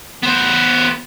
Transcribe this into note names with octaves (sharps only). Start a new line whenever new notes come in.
B3 C5